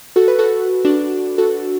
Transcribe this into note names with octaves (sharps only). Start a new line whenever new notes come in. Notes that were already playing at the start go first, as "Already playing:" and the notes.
F#4 A4
B4
F#4 A4
D4 F#4
F#4 A4